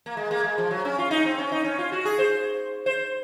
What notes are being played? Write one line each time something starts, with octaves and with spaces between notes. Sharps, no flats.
A#3
G#3
A#3
G#3
F3
F#3
C#4
F4
D#4
C4
C#4
D#4
C#4
F4
F#4
G#4
C5
C5